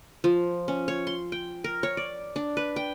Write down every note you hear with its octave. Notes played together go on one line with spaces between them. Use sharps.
F3
C#4
C#5
C6
G5
A#4
C#5
D5
D4
B4
G5